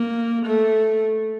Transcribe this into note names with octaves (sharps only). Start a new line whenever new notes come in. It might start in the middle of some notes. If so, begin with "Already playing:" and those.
Already playing: A#3
A3